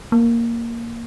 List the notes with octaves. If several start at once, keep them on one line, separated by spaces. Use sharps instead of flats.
A#3